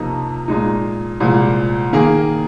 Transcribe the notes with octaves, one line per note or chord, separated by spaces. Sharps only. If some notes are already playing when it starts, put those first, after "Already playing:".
Already playing: F2 C3 F3 A#3 D#4
A#2 G#3 D#4
C2 A#2 F3 G#3
D#3 A#3 G#4